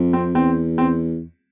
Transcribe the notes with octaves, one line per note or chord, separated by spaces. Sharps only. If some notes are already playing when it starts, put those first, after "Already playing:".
Already playing: F2
C4
E2 C4
C4